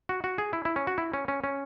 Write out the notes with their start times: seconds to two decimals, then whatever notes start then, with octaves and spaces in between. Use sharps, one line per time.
0.09 F#4
0.24 F#4
0.38 G#4
0.53 E4
0.65 E4
0.76 C#4
0.87 F#4
0.98 E4
1.14 C#4
1.28 C#4
1.44 C#4